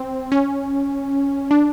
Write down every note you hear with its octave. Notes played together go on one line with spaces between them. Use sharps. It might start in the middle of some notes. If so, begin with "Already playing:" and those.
Already playing: C4
C#4
D4